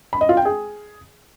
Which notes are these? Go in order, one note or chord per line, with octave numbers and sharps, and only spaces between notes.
B5
D#5
F4
G5
G#4